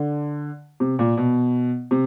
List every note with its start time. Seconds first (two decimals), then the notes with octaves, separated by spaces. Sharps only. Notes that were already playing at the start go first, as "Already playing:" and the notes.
Already playing: D3
0.80 C3
0.99 A#2
1.17 B2
1.91 C3